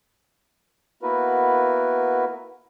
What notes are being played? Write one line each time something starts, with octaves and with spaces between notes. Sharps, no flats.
A#3 B3 E4 F#4 A#4 B4